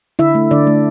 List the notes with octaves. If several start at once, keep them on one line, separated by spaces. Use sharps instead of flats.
D3 E4 E5
A3
D3 D4 D5
A3